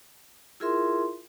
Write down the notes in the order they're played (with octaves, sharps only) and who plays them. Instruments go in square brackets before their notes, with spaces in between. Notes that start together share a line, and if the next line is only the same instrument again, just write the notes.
[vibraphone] E4 F4 G#4 A#4 E5 C6